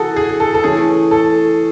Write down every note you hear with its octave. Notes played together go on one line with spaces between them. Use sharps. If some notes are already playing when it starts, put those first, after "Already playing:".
Already playing: E3 F#4 G#4 A4
G#4
A4
A4
E3 A3 C#4 G#4
A4